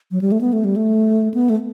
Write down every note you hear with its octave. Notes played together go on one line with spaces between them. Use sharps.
F#3
G3
A3
B3
A3
G3
A3
B3
A3